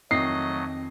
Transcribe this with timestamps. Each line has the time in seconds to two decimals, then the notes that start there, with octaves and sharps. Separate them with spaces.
0.11 F2 D#3 F#3 A3 D#5 C7